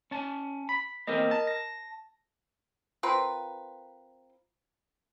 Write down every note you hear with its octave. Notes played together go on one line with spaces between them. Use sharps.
C#4 A5
B5
E2 A#3 C4 A#4 D#5
A5
A#6
C4 F4 A#4 B4